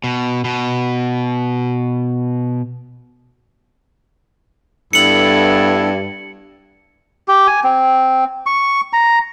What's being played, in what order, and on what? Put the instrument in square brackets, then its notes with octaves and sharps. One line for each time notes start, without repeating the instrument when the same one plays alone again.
[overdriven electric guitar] B2
B2
[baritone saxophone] G2 [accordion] B3 E4 A4 [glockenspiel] C#7 F#7
[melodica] G4
G#5
C4
C#6
A#5